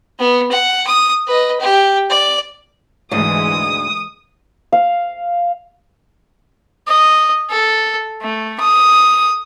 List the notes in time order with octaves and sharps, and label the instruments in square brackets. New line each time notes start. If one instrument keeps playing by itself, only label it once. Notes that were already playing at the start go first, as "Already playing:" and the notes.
[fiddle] B3
F#5
D#6
B4 D#5
G4
D5
[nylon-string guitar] D2 G#2 [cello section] E3 G#3 [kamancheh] D#6
[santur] F5
[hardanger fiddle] D#5
A4
A3
D#6